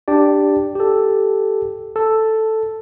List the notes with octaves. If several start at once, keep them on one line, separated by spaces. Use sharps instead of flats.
D4 G4 D5
G4 A4
A4